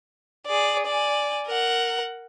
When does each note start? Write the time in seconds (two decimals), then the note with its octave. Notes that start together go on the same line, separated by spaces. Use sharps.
0.47 G#4 D5
0.86 D5 G#5
1.47 A#4 F#5